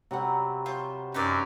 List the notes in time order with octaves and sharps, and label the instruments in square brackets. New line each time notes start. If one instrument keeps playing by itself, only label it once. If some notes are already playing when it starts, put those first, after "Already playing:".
[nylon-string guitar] C3 F#5 [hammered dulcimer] F#3 G3 C4
[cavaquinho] F4 [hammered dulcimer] C5 C#6
[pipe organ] F#2 [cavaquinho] D#4 B4 D5